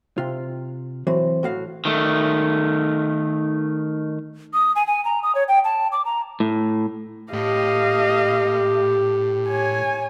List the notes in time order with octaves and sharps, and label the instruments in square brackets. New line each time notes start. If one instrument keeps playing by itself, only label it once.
[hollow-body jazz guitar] C3 F4
E3 F#3 C4
A2 F#4 F5
[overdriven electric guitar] D#3 A3
[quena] D#6
G#5
G#5
A#5
D#6
C#5
G5
A5
D6
A#5
[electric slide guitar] A2
[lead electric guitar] A2 [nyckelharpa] G4 [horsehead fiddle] D#5 F5
[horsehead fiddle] C#5 G#5